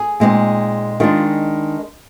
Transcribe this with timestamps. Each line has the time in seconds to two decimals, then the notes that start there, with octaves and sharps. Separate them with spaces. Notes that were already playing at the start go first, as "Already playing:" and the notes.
Already playing: G#4
0.20 A#2 G#3 C4 D#4
1.00 D#3 G#3 D4 F4